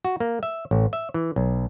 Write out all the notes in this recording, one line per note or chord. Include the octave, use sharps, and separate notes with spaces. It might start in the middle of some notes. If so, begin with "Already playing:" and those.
F#4
A#3
E5
A1
E5
E3
B1